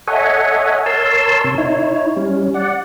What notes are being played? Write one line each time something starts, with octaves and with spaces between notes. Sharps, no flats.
A4 C#5 D#5 E5 F#5 G#5
A#4 C#5 A5 C6 E6
C3
D#4 E4 C#5
G3 C#4
D5 F#5